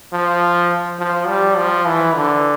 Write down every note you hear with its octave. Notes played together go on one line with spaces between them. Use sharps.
F3
F3
G3
F3
E3
D3